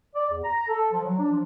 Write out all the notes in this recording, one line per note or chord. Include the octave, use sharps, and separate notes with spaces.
D5
E2
A#5
A4
F3
F#3
D4
F3